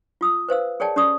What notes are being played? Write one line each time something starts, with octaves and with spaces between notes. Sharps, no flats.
F4 D#6 E6
B4 C5 F5 E6
G#4 A#4 C#5 D5 G5 A5
C#4 G4 D5 D#6